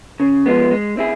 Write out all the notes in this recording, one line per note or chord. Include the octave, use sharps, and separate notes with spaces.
C#3
F3 G#3 B3
G#3
C4 E4 G#4